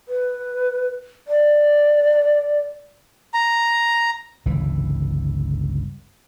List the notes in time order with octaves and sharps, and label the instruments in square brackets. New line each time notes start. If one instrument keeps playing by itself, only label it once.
[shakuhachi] B4
D5
[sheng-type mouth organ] A#5
[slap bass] G1 C#2 C3 E3